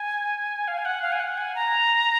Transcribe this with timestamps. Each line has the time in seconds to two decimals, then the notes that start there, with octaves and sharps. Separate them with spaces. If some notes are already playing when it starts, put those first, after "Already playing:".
Already playing: G#5
0.68 F5
0.78 G#5
0.85 F#5
1.02 F5
1.12 G#5
1.20 F#5
1.38 G#5
1.55 A#5